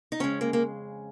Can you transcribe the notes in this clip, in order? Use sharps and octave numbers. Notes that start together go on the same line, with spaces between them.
D#4
F2 C#3 G#3 C#4
A#3
A#3